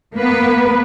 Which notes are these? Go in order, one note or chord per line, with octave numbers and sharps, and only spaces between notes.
A#3 B3 B4